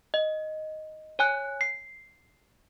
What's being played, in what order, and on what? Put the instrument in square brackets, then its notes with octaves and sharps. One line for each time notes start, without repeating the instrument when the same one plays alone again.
[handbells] D#5
C#5 G#5 F#6
C7